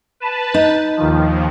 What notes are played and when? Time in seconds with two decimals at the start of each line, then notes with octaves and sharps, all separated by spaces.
0.20 B4 A5
0.54 D#4
0.97 D#2 D#3 F3